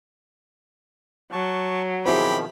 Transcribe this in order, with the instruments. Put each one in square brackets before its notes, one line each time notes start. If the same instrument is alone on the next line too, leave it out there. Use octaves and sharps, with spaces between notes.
[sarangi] F#3 [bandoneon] A5 C#6
[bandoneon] B2 D#3 F3 [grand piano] C4 E4 G#4 [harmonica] G4 B5